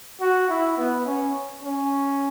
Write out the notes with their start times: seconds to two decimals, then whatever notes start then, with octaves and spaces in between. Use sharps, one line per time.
0.20 F#4
0.49 E4
0.78 B3
1.06 C#4
1.63 C#4